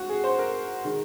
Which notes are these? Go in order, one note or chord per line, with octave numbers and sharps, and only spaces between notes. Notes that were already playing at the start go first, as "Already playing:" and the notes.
Already playing: G#2 F#4
G#4
C5
A#4
D#3 G#3